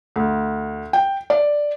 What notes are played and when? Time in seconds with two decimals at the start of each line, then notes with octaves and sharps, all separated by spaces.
0.16 D2
0.93 G5
1.30 D5